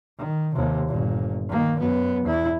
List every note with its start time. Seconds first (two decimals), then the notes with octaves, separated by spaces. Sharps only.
0.19 D#3
0.55 D#2 C3
0.89 G1 A#2
1.49 D#3 A#3
1.79 F#2 B3
2.24 E2 E4